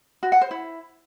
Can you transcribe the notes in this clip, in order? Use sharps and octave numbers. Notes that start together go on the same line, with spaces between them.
F#4
F#5
C5
E4